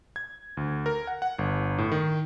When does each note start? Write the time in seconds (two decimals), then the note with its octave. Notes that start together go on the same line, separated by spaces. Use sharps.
0.16 G#6
0.57 D2
0.86 A#4
1.07 F#5
1.22 F#5
1.39 G1
1.78 A2
1.91 D#3